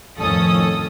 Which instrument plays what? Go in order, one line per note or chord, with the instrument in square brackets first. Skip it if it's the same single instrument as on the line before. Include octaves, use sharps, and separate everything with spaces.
[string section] F2 A2 D#3 C#4 A4 D#6